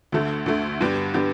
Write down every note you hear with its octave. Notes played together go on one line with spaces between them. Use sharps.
D2 D3 A3
D2 D3 A3
G2 D3 B3 D4 G4
D3 B3 D4 G4